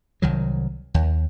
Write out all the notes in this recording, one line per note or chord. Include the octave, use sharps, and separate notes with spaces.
C2 D#3 F#3
D#2